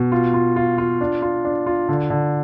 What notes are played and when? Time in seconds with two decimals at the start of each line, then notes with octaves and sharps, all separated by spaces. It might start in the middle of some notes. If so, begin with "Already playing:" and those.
Already playing: B2
0.12 F4
0.34 F4
0.56 F4
0.78 F4
1.01 D4
1.22 F4
1.45 D4
1.66 F4
1.89 D3
2.10 D3